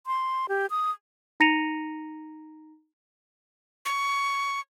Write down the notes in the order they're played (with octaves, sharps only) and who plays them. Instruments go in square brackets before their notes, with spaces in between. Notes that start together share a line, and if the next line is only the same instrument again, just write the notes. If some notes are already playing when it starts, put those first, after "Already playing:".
[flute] C6
G4
D#6
[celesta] D#4 A#5 A#6 C#7 D#7 F7
[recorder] C#6